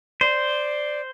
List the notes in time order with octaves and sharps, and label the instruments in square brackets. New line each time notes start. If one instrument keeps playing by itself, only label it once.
[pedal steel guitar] C5 [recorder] D5